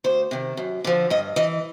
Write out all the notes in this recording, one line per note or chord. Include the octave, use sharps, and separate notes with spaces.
D2 C5
C3 D#3
F#2
D3 F3
G2 D#5
E3 D#5